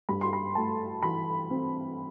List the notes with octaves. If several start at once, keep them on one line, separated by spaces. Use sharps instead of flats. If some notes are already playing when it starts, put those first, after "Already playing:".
G2 B5
C6
B5
A3 A5
E3 B5
C4